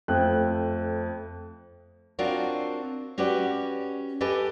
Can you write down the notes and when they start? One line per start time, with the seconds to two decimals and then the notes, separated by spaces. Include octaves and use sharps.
0.08 F2 A3 C5 G5 F#6
2.19 C4 D4 F4 F#4 A#4 C#5
3.18 C#4 F#4 G4 B4 D5
4.21 G4 A4 B4 D#5 G#5